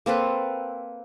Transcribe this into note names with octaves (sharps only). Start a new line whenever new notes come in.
A#3 C4 A4 B4